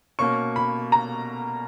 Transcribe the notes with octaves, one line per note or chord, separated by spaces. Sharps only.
B2 A#3 C#4 C#6
B5
A#5